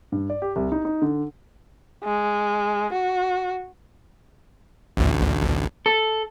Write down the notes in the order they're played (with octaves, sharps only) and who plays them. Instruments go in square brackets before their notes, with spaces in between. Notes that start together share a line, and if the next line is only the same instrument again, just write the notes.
[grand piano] G2
D5
G4
C2
D#4
D#4
D3
[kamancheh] G#3
F#4
[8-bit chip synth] A1 D2
[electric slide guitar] A4